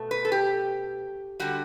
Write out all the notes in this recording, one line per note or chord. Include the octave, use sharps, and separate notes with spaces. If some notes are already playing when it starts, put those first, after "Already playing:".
Already playing: B2 A3
B4
A4
G4
D3 G3 F#4